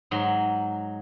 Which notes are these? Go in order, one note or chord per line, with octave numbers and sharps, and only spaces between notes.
G#2 F#3